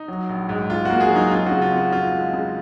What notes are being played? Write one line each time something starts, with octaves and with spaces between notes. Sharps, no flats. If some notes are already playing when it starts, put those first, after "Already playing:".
Already playing: D#4
F#3
A#1
G#2
G#2 F4
F#4
A#3
G#4
F#3
D#4
F2 F4
C#3 F#4
F4
F2
F#4
F2 F4
G#3
C#3